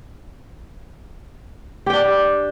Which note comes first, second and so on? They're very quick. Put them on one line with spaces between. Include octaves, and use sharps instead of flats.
G4 G5 D4